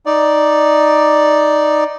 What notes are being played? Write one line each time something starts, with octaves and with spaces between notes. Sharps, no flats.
D#4 D5